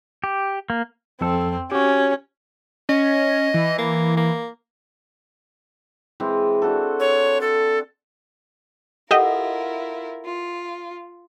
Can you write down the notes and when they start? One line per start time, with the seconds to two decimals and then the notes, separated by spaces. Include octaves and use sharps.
0.24 G4
0.70 A#3
1.21 F2 C4 A4
1.71 C#4 F#4 G4
2.89 C#4 D#5
3.54 E3
3.78 A#3
4.17 A#3
6.20 E3 G#3 C4
6.62 D4 F#4 A4
7.00 C#5
7.41 A4
9.11 E4 F4 G4 A4 A#4 D#5 E5 F#5
10.24 F4